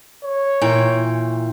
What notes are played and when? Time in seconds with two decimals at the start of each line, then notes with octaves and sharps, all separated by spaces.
0.23 C#5
0.61 A#2 E3 G5